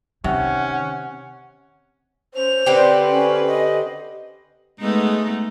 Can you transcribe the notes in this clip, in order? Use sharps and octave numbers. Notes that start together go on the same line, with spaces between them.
C3 D#3 C#4 F#5
C#4 C5 F7
D3 C4 G4 B4
C#4
D#5
G#3 A3 B3 D#4